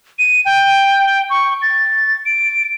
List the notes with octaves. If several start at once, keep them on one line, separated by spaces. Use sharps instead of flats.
D#7
G5
C#6
A6
D7